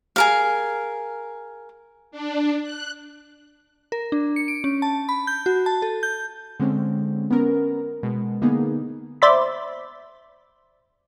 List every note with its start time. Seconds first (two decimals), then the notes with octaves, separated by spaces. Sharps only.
0.16 G#4 A#4 F5
2.11 D4
2.62 F#6
3.92 A#4
4.12 D4
4.36 C#7
4.48 D7
4.64 C#4
4.82 A5
5.09 B5
5.27 G6
5.46 F#4
5.66 A5
5.82 A4
6.03 G6
6.60 D3 G#3 C4 C#4
7.31 B3 C#4 A#4
8.03 B2 G#3
8.42 D3 A#3 B3 D#4 G#4
9.22 C5 D5 E5 B5